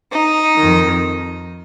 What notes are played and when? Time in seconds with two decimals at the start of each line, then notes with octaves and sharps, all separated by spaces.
0.13 D#4
0.57 D#3
0.62 F2